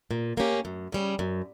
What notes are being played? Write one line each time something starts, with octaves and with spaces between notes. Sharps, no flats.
A#2
A#3 C#4 G4
F#2
C#3 G3 C#4
F#2